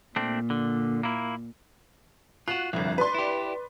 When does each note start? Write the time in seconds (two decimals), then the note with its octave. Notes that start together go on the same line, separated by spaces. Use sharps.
0.16 A#2 A3 C4 D4
0.50 D3
1.03 A#3 E4
2.48 F4 F#4 F#6
2.73 G1 C2 F2
2.98 B4 D5 C6
3.15 E4 G4